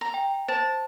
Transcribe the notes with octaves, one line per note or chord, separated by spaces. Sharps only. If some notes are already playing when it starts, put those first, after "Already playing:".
A#5
G5
C5 A5